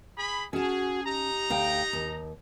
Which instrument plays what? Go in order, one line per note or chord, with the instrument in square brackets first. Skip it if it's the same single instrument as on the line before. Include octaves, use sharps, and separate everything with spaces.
[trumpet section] G#4 B5
[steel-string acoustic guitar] C#4 A5 [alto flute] F#4 [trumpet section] G#4
[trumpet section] D#4 A#5 [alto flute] G4
[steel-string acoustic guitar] D2 F5 G5
D#2